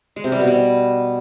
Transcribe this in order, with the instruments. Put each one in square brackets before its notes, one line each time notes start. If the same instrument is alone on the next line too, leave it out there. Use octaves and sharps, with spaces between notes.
[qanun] G#3
C3
G3
B2
G3